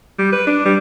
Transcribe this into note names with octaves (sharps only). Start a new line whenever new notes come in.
G3
B4
D4
G3